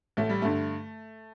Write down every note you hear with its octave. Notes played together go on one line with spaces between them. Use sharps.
A1 A3
G3
G2 D3 A3